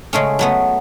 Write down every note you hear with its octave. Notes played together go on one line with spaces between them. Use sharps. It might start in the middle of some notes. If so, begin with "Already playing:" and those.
C#3 G#3 A3 C#4
F#3 A3 B3